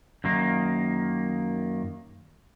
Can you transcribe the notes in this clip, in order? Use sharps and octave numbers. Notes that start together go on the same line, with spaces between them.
F#2 D#3 A#3